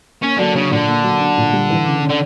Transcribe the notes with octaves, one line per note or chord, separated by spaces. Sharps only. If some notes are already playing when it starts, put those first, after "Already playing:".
A#3 C#4
D3 F#3
C#3 D4
A#2 D3
A#3
F#3
D4
A#2
G3
E3
C#3
C#3
D3